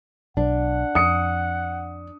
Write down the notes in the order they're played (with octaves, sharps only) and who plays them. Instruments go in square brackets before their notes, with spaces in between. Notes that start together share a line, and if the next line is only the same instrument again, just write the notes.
[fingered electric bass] B1 [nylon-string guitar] D4 [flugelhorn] F#5
[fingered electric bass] F2 [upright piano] D#6 C#7